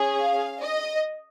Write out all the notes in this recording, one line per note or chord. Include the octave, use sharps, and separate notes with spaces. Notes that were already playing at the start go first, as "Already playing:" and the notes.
Already playing: C#4 G#4
F5
D#5